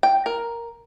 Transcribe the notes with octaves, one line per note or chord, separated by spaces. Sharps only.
G5
A#4